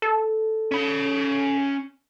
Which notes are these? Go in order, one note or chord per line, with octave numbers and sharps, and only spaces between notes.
A4
C#4 B5